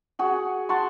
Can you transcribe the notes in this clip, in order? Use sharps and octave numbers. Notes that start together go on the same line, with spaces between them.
F#4 G#4 F#5
F#5 A5 C6 C#6